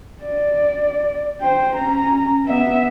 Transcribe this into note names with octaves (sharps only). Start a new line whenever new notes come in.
D5
C5 G5
C#4 A#5
B3 E5